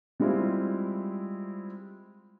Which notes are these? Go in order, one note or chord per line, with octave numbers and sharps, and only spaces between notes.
G3 G#3 C4 E4 F4 G4